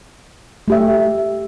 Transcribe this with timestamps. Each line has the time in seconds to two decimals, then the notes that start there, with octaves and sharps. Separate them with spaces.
0.68 A3 G4 E5